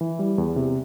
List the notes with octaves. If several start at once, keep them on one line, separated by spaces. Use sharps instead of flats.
E3
G3
E2
C3